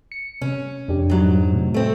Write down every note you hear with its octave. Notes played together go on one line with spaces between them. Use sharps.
C#7
C3 C#4
F2 D4 G4
G#2 F#3
A2 C3
A3 C4